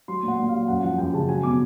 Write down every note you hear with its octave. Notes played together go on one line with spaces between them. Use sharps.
F#3 C6
A#2
F#5
A#2
F5
F#3
F#2 F#5
F3 F#5
F#2 G5
C#3 A5
F#3 G#5
B2 D6